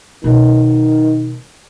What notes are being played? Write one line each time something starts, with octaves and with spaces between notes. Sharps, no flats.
B2 D#3 G#3